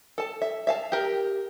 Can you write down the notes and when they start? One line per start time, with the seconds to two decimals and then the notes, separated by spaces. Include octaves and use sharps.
0.18 A4 A5
0.42 E5
0.67 E5 F5 A5
0.92 G4 A#4